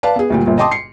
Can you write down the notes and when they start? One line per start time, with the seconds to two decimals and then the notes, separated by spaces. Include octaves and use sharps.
0.03 B4 D5 F5 A5
0.16 B3 G#4
0.30 D2 A#2 G3
0.46 G1 A#2
0.58 D#5 G5 A5 C6 D6 D#6
0.71 C7 C#7